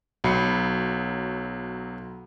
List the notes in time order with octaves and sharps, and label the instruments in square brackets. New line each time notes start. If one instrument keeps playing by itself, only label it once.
[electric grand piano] B1 F#3 B5 C7 C#7